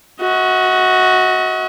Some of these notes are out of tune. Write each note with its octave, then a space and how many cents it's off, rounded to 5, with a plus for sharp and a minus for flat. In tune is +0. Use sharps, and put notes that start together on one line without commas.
F#4 +0 D#5 +45